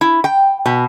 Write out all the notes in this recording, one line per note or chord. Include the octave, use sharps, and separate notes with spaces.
E4
G5
B2